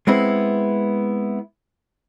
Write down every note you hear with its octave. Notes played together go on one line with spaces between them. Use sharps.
G#3 B3 C4 E4